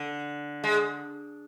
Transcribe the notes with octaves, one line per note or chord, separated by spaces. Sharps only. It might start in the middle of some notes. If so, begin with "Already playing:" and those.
Already playing: D3
G#3